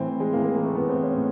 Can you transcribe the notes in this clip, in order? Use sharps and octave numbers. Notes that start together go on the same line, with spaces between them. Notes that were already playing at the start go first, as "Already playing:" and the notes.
Already playing: A2 E3 C4
G#3
A2 E3 A#3
A#3
A#3
A3
A2 E3 B3
C4
C#4
A2